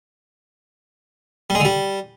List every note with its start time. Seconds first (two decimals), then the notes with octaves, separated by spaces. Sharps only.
1.50 G3
1.55 G#3
1.60 D3
1.65 G3